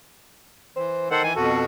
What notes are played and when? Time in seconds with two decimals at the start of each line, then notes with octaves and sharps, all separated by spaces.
0.76 E3 C5
1.11 D#3 A4 C5 F#5
1.24 E3 G#5
1.36 F2 B2 F#4 A4